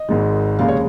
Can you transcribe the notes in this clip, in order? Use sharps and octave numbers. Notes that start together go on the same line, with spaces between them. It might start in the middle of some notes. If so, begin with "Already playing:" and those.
Already playing: D#5
G#1 G#2 D#3 G#3
F1 D#2 C#3 G#3 F5
C#5